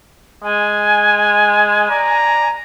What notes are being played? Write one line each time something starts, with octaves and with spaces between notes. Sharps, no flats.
G#3 G#5
D5 A#5